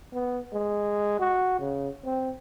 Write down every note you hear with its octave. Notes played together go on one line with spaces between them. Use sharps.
B3
G#3
F#4
C#3
C4